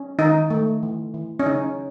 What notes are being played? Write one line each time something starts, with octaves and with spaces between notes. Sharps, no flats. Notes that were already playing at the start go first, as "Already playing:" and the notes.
Already playing: C#4
D#3 D#4
A3
E3
E3
C#4
C#3 D#4